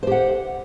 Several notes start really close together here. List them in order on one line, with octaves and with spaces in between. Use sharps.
C5 G4 F#5